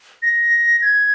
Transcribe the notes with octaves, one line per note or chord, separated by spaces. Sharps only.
A#6
G#6